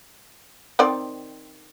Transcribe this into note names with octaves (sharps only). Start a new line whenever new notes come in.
D#3 C4 D5